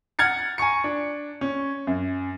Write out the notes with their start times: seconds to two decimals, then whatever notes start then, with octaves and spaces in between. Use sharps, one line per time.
0.19 F#5 F6 G#6 A6 C#7
0.58 G#5 A#5 C#6 C#7
0.84 D4
1.41 C#4
1.87 F#2